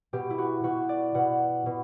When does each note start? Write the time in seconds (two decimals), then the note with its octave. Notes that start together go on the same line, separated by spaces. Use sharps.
0.13 B2 G4
0.30 E4
0.38 F#4
0.63 B2 F#4
0.89 D5
1.14 B2 F#5
1.66 B2